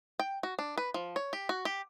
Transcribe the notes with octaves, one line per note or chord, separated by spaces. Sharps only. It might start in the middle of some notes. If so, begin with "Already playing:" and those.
G5
F#4
D4
B4
F3
C#5
G4
F#4
G4